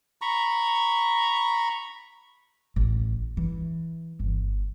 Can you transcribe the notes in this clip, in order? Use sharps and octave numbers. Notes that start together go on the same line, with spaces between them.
A#5 B5 C#6
A1
E3
G1